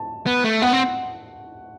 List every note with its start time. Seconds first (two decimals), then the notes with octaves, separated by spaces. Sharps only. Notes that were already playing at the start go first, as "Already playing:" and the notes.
Already playing: A5
0.26 B3
0.44 A3
0.62 B3 F#5
0.73 C4